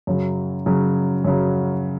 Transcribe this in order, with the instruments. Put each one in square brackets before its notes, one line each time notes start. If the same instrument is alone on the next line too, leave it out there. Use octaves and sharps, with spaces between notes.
[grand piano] F#2 C#3 F#3
F#2 C#3 F#3
F#2 C#3 F#3